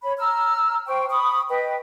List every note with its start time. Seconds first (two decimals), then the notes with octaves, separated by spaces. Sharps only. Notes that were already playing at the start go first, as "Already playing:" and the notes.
0.03 C#5 B5
0.18 A#5 E6 F6
0.87 C5 G5 C#6
1.10 B5 C#6 D#6
1.49 B4 D#5 G5